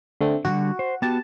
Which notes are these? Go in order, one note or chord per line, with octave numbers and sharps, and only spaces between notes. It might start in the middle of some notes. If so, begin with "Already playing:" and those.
D3 A3 C4
D3 E3 G3 F#4
C5
B3 F#4 G4 A5